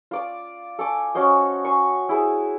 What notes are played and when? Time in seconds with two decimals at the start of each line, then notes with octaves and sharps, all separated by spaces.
0.11 F4 D5 D6
0.79 A4 G#5 D6
1.15 C#4 F#4 C5 D#5
1.64 G#5 C6 C#6
2.09 E4 G#4 C5